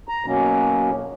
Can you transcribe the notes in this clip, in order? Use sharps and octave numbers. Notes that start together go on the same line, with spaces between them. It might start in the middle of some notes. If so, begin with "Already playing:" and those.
A#5
B2 F#3 A#3 C#4